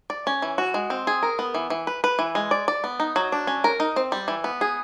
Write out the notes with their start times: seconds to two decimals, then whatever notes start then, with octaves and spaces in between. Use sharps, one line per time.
0.10 D5
0.27 C#4
0.42 E3
0.58 F#4
0.74 G#3
0.90 C4
1.07 G#4
1.23 A#4
1.39 B3
1.55 E3
1.70 E3
1.87 B4
2.04 B4
2.19 E3
2.35 G#3
2.51 D5
2.68 D5
2.84 B3
3.00 D#4
3.16 F#3
3.32 D4
3.47 C#4
3.64 A#4
3.80 D#4
3.96 C4
4.12 G3
4.28 E3
4.44 B3
4.61 G#4